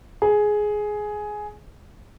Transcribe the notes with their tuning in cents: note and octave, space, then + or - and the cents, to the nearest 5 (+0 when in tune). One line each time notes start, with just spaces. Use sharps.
G#4 +10